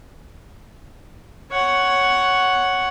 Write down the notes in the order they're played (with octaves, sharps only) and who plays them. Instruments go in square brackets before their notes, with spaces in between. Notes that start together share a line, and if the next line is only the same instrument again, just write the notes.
[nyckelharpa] C#5 F#5